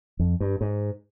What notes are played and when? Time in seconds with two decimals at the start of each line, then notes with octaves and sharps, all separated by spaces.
0.19 F2
0.40 G2
0.61 G#2